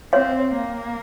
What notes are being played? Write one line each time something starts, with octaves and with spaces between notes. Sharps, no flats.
C4 C#5 F5
A#3